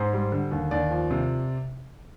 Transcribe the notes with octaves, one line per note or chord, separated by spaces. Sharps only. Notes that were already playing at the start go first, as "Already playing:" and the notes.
Already playing: G#2 C5
G3
D3
D#2
D#2 D5
F3
C3